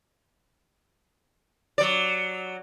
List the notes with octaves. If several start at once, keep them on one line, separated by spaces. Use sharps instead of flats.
F#3 D5